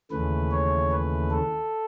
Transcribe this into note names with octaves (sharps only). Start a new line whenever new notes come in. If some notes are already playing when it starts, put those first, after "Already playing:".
D#2 C#3 E3 A3 B4
C#5
B4
A4